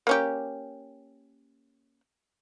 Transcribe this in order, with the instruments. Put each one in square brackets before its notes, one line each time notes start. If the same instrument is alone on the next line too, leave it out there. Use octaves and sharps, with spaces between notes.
[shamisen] A#3 C#4 G4